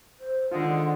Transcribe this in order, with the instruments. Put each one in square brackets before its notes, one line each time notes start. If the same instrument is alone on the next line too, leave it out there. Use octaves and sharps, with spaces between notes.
[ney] C5
[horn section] D3 G#3 [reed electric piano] D#3 F4 [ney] F#5